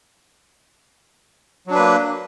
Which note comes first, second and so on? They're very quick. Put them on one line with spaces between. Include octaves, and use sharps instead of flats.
F#3 D4 B4 A#3